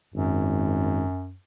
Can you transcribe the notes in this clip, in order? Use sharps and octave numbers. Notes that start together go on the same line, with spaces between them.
G#1 F#2